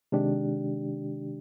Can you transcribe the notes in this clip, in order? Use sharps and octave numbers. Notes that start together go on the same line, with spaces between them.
C3 D#3 G#3 D4 G4